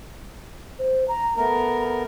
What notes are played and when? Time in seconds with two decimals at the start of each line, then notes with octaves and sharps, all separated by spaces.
0.79 C5
1.08 A#5
1.37 A3 B3 A#4 A#5